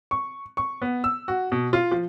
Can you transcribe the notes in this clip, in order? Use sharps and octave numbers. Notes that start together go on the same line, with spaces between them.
C#6
C#6
B3
E6
F#4
B2
F4
F3